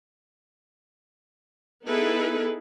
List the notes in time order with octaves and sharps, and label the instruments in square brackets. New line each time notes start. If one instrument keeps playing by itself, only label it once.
[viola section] B3 D#4 E4 G#4 A4 B4